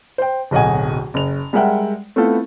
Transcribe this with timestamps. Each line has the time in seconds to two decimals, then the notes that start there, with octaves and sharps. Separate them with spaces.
0.18 C5 G5
0.51 D1 B1 D#5 F#5 G#5
1.14 F#1 F7
1.53 G3 G#3 A#4 E5 F#5 G5
2.16 A3 B3 C4 E4 F4 A4